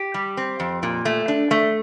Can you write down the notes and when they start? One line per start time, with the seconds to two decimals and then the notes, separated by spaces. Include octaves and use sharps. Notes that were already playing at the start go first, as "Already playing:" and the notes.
Already playing: G4
0.14 G3
0.37 C4
0.60 F2
0.83 A#2
1.05 A3
1.28 D4
1.51 A3